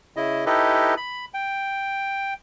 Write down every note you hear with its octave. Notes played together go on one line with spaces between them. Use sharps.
C#3 E4 D#5
D#4 E4 G4 A4 B4 D#5
B5
G5